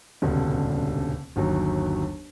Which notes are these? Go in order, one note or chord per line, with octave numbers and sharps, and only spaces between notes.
D#1 C#2 G2 B2 D3
G1 D#2 F#3